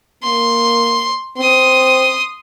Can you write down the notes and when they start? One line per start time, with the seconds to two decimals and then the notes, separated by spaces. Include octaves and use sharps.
0.23 A#3 C6
1.37 C4 C6 D#6